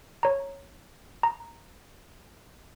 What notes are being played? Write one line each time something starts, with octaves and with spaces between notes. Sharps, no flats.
C#5 A#5
A#5